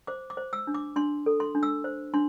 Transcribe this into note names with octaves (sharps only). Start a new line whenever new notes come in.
C5 D6
D6
C5
E6
D4
D6
D4 C6
A4
C6
D4
E6
C5
D4 C6